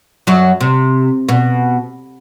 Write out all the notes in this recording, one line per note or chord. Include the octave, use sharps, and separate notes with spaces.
F#2 F#3
C3
B2